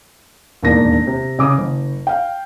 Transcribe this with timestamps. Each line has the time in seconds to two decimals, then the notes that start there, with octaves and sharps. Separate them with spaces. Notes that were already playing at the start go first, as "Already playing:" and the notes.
0.63 E1 D#2 A2 A#3 D4 A#6
1.07 C3
1.39 C#3 D6 D#6
1.58 F#1
2.07 F5 G5